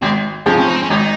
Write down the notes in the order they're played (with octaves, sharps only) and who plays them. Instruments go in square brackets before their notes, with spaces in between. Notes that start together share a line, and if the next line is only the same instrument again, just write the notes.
[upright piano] G#1 [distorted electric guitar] C4
[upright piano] G#2 F3 G#3 C4 [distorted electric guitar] C#4
[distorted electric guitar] C#4
D#4
C4
C#4
[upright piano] G#1 [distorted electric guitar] D#4